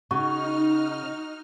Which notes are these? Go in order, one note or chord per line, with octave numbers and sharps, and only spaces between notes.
C#3 D#4 F#4 C#6 F6